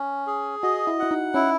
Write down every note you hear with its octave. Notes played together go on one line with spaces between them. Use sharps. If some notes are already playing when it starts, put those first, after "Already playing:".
Already playing: C#4
G#4
F#4 D#5
E4
E4 F#5
D#4
C#4 E4